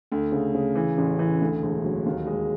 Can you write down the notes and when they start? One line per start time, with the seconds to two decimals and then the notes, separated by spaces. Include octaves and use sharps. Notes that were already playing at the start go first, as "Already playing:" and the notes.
0.12 D2
0.32 C#3
0.55 C#3
0.75 E3
0.98 A1
1.19 E3
1.41 D2
1.63 E1
1.84 F#3
2.06 D#2
2.27 G#3